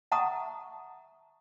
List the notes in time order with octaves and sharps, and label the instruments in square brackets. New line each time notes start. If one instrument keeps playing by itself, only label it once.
[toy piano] E5 F#5 A5 A#5 C#6 D#6